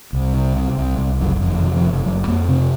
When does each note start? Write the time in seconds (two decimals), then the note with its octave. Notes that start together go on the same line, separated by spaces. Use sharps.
0.13 C2
0.34 C3
0.56 C3
0.78 C2
0.98 C2
1.20 F#1 F#3
1.42 F2
1.49 D#3
1.63 C3 D#3
1.77 F3
1.85 F#1
2.06 F#1 F#3
2.27 F2 A#3
2.48 C3 C4